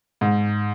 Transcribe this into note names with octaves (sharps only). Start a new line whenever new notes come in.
G#2